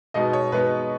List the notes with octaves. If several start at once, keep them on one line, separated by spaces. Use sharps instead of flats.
B2 G#3 B3 D#4 D#5
C#5
B2 G#3 B3 D#4 B4